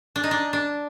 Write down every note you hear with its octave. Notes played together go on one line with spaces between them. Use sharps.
D4
D#4
D4
D4